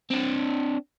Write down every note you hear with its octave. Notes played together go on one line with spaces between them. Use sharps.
C4 D4